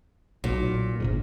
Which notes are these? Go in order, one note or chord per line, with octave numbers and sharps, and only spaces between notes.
B1 A#2
G1 C#2 G#2